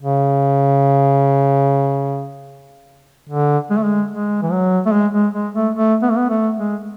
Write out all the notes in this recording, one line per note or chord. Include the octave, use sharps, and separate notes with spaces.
C#3
D3
G#3
A3
G#3
G#3
E3
F#3
A3
G#3
G#3
G#3
A3
A3
B3
A3
B3
A3
G#3